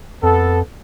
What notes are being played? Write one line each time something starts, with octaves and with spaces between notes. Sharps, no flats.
F2 B3 A4